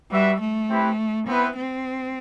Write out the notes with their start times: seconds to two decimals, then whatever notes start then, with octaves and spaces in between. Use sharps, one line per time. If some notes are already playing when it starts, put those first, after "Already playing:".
0.11 G3 F#4 B4 E5
0.41 A3
0.70 C4 E4 G4 B4
1.27 B3 C4 E4 B4
1.56 C4